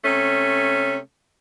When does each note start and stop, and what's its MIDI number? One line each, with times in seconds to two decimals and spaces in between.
0.05 0.97 48
0.05 0.97 57
0.05 0.97 61